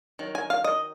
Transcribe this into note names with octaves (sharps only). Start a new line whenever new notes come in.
D#3 F#3
G#5
F5
D#5